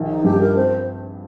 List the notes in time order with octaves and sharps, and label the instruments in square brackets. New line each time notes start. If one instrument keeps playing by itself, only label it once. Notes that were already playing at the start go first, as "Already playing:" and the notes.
Already playing: [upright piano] A#1 D#3
[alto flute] D#4
[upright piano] G2 [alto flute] G4
[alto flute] A#4
[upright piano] C4 [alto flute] C5